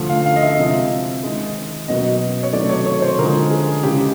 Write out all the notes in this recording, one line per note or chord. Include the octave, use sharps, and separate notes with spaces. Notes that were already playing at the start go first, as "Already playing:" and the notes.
Already playing: D3 F3 A3
F5
F5
D#5
E5
C3 F3 G#3
D#3 G#3
B2 F#3 A#3 D#5
C#5
C3 D#3 F#3 A3 D5
C#5
C#5
C5
D3 F3 G#3 A#4
G#4
C#3 E3 G#3 G4